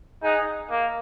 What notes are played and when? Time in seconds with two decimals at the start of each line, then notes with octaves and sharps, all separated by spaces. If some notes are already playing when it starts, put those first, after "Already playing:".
0.23 D#4 G#4 D#5 F#5
0.71 A#3